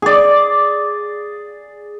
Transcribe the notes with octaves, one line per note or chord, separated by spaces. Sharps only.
G#4 D5